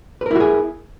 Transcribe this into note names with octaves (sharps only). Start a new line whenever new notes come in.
E4 F#4 G#4 A#4 B4